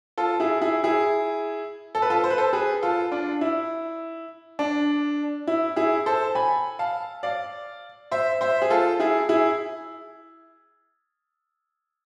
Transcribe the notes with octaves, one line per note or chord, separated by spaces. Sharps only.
F4 A4
E4 G#4
E4 G#4
E4 G#4
A4
B4
F4 A4
C5
B4
A4 C5
G#4 B4
F4 A4
D4 F4
E4
D4
E4
E4 G#4
A4 C5
G#5 B5
F5 A5
D5 F5
C5 E5
C5 E5
G#4
F4 A4
E4 G#4
E4 G#4